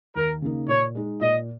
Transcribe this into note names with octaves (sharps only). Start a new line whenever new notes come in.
D#2 A#4
C#3 A#3 D#4
A#2 C#5
G#3 D#4
A#2 D#5